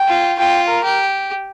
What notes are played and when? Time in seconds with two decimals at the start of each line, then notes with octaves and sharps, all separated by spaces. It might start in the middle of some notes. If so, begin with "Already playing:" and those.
Already playing: G5
0.08 F4
0.39 F4 G5
0.69 A#4
0.84 G4